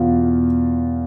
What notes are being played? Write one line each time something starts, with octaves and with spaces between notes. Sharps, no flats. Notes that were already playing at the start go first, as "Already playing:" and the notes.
Already playing: E2 B2 F4